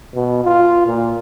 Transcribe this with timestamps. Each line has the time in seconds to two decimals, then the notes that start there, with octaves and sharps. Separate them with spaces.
0.14 B2
0.44 F4
0.86 A#2